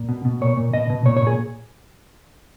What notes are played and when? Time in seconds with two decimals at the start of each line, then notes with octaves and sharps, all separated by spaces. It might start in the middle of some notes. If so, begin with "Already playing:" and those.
Already playing: A#2
0.09 B2
0.25 B2
0.41 A#2 C#5
0.57 A#2
0.74 B2 D#5
0.90 B2
1.05 A#2 C#5
1.17 C#5
1.22 A#2
1.27 G#4